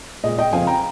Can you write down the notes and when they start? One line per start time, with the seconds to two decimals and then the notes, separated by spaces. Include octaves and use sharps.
0.24 A#2 G#3 D#5
0.39 D#5 G5
0.52 F2 C#3 F3 F5 G#5
0.67 G5 A#5